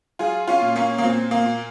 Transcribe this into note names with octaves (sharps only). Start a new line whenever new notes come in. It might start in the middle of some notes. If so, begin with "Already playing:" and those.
F#3 F4 G#4
C#4 F4
A#2
A#3 C#4
A#3
A#2 C4
A#3
A#2